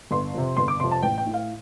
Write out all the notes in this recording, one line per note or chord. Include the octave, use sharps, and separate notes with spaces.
G1 C6
F2 C3
G1 C6
D6
F2 C3 C6
A5
A1 G5
G5
A2
F5